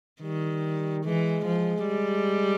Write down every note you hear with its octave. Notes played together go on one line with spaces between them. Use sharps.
D#3 G3
E3 G#3
F3
G3